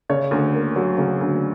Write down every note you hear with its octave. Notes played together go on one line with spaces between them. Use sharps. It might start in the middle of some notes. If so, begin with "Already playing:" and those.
C#3 C#5
D2
A#3
F#3
C#3
D2